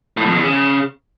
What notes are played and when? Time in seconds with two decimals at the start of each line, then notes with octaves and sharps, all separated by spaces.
0.17 A2
0.26 F2
0.35 E2
0.44 C#3